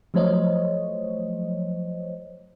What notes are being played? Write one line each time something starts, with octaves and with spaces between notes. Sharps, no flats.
F3 F#3 A3 C5 C#5 D#5